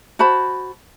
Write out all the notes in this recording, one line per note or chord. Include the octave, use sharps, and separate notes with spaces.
F#4 C5 A5 B5